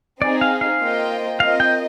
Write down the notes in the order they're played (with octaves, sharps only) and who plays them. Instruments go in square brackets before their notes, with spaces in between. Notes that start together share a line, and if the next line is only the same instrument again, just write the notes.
[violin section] C4 D#4 G#4 [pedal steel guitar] D5
[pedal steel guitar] F5
F5
[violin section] A#3 F4 C5 D#5 G5
[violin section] C4 F4 A#4 D#5 [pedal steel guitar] F5
[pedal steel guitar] G5